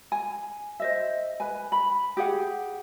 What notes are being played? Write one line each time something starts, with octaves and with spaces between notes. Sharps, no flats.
G#5
C5 D#5 E5
B4 G#5
B5
G4 G#4 F#5